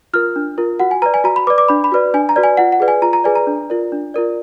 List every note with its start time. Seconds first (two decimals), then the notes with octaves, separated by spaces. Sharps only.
0.13 F4 A#4 F6
0.36 D4
0.58 F4 A#4
0.79 F#4 F#5
0.91 G#5
1.02 B4 D5 A#5
1.14 G#5
1.24 F#4 A#5
1.36 B5
1.47 B4 D6
1.50 D5
1.58 D6
1.68 D4 B5
1.84 B5
1.92 F#4 B4 D5
2.14 D4 G#5
2.29 A#5
2.36 F#4 B4 D5
2.43 G#5
2.57 F4 F#5
2.72 F#5
2.80 G#4 B4 D5
2.88 G#5
3.02 F4 A#5
3.13 A#5
3.24 G#4 B4 D5 G#5
3.35 A#5
3.47 D4
3.70 F4 A#4 D5
3.92 D4
4.14 F4 A#4 D5